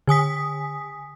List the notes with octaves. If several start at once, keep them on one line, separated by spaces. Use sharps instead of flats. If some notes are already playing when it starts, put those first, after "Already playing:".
D3 G#5 D#6 B6